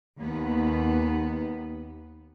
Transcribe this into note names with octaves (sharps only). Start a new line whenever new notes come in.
D#2 B3